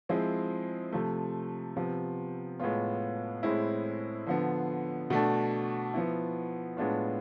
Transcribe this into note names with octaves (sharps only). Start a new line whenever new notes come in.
F3 G#3 C4 E4
C3 F3 A3
C3 F3 B3
A2 G#3 B3 F4
A2 G#3 C4 E4
D3 F3 B3
B2 A3 D4
F3 B3 E4
A2 G#3 B3 D4 F4